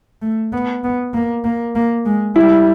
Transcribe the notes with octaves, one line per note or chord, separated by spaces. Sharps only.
A3
B3
B3
A#3
A#3
A#3
G#3
G3 E4